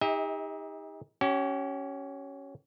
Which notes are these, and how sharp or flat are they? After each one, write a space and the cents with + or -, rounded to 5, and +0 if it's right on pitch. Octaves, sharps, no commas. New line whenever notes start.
D#4 +30 G4 +45 E5 -45
C#4 +0 G4 -45